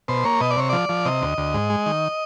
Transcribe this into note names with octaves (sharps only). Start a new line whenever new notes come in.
B2 C5
A#3 C#5
B2 D#5
D5
C3 C#5
F3 D5
F3
C3 D#5
D2
D2
G#2
G#3
D#3